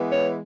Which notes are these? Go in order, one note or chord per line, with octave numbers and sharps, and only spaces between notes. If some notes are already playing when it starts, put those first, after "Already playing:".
Already playing: E3 G#3 B3
C#5